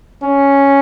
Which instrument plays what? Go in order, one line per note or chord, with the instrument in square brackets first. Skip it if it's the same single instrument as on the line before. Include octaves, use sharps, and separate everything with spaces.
[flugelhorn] C#4